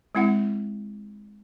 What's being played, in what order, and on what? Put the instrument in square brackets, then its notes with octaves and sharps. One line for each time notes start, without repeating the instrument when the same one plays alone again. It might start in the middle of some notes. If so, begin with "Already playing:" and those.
[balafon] G#3 C4 E4 F#5